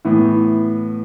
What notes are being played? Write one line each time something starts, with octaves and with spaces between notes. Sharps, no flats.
A2 E3 B3